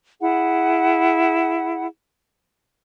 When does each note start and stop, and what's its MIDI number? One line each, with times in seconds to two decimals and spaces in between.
0.20 1.86 64
0.20 1.86 68
0.20 1.86 78